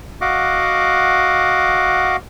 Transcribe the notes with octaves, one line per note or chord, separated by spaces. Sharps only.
F#4 D#5 F5 F#5 D6